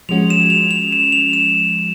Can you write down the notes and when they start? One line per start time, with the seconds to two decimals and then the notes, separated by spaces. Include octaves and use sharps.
0.09 F3 G#3 C#4 F#4 F7
0.30 E7
0.50 F7
0.71 F7
0.92 E7
1.12 F7
1.33 E7